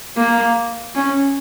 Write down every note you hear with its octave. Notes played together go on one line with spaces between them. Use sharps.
A#3
C#4